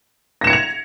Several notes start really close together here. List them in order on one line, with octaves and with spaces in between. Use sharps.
A#6 E7 C#7 G#6 F7